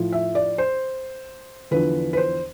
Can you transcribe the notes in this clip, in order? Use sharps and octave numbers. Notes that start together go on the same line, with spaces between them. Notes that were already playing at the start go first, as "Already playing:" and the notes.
Already playing: A2 F3
E5
D5
C5
E2 D3 F3 B4
B4
C5